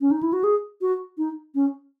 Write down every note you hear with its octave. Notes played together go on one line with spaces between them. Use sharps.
C#4
D#4
E4
F#4
G#4
F#4
D#4
C#4